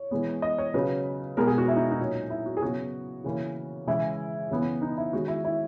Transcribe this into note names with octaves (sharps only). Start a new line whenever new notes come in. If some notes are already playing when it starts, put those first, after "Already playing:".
Already playing: C#5
E3 G#3 B3
D#5
C#5
C#3 F#3 C#4 B4
B2 G#3 B3 A#4
G#4
F#4
E4
D#4
D#4
A#2 F#3 C#4
E4
F#4
G#4
C#3 F#3 B3 F#4
C#3 E3 A#3 C#4
C#3 E3 G#3 C#4 E4
C#3 E3 B3
D#4
E4
D#3 G#3 C#4 F#4
E4
E4